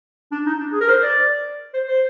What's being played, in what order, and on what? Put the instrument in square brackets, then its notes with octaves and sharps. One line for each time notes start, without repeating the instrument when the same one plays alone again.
[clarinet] D4
D#4
D4
G#4
A#4
C5
D5
C5
C5